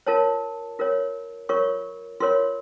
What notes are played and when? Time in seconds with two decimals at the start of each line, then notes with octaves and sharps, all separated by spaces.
0.07 F4 A#4 C#5 A5
0.79 F4 A#4 C#5
1.49 F4 A#4 C#5 C#6
2.20 F4 A#4 C#5 C6